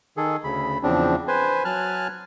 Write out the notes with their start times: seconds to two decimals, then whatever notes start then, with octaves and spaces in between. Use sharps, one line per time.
0.17 D#3 G#4 A4
0.44 D2 C#3 B5
0.83 E2 C#3 F3 C4 D4
1.28 B4 C5 G#5
1.65 F#3 G#5 A5 F6 F#6